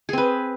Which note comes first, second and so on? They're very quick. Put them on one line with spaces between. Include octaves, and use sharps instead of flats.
G#4 C4 B4